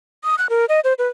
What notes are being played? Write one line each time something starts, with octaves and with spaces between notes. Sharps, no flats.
D#6
F#6
A#4
D#5
C5
B4